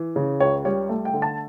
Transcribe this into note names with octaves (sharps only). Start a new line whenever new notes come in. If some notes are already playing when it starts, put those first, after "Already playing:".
Already playing: E3
C#3
C#2 C#5
G3 C#5
A3
G5
D3
A5